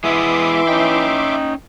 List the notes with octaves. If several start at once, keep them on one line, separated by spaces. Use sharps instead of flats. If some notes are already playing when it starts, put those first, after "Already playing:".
E3 G#3 B3 E4 E5 C6 D6 D#6
C#4 D#4 G5